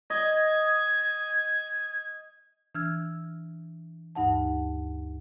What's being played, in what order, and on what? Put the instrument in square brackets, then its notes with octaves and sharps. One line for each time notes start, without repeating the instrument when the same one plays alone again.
[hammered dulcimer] D#5 [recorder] G#6
[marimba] E3 D4 E6 F6 G#6
D2 G2 D#4 F#5 A5